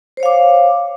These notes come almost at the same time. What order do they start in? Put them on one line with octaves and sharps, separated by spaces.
C5 C#5 F5 D6